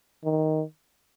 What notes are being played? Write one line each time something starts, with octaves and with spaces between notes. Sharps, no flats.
D#3